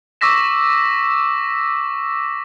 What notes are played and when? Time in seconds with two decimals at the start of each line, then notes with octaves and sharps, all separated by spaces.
0.21 C#6 D6 E6 A#6 B6 E7